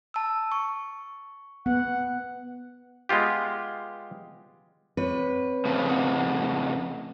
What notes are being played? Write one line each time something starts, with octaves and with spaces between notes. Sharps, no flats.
A5 E6
C#6
B3 F#5
G#3 B3 F4 G4
C4 B4 C#5
F2 A2 C#3
C4 F#5